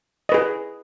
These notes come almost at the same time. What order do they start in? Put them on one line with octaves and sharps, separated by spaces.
D#5 B4 G#4